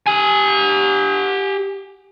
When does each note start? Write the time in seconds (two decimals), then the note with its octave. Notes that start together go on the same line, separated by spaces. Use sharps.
0.07 G4 G#5